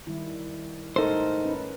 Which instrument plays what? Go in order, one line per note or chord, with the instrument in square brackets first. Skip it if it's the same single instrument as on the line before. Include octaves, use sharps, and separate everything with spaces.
[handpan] D#3 G3 E4
[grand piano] G#2 A3 A4 [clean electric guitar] D#4 C5 [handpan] A#4
[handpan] C#4 B4